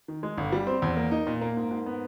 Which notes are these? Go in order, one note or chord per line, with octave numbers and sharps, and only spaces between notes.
D#3
G#3
G1
G3
C4
E2
A#3
D#4
A#2
A#3
G#2
G#2
B3